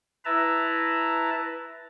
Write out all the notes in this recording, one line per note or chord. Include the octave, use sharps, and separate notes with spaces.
E4 B4 E5 A5 A#5